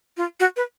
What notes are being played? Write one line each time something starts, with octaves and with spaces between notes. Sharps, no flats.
F4
F#4
B4